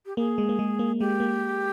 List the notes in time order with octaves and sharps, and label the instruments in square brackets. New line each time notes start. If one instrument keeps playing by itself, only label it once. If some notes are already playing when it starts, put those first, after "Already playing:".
[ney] G4
[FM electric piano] A#3 [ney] G#4
[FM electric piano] G#3
A#3
G#3
A#3
[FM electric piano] G#3 [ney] G4
[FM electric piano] A#3